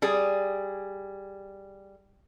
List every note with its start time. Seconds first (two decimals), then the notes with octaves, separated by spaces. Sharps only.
0.02 G3 G#4